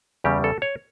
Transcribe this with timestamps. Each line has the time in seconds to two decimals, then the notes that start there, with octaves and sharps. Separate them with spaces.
0.24 E2 C#3 G3 G4
0.44 A4
0.62 C#5